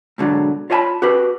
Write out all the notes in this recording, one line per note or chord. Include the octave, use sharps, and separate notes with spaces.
G#2 B2 D3 F3 F#3
F4 C#5 D#5 G#5 A5 B5
F#4 G4 B4